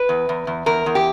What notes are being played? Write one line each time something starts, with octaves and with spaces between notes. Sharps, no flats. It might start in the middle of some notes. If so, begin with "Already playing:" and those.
Already playing: B4
E2
E2
E2
E2 A#4
E2
G4